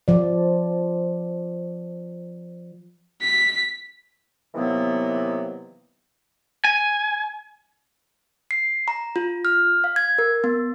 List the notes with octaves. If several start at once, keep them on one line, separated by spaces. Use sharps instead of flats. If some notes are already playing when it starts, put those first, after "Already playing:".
F3 D5
B6
C3 D#3 E3 F#3 A#3 B3
G#5
C7
A#5
F4
F6
F5
G#6
A#4
B3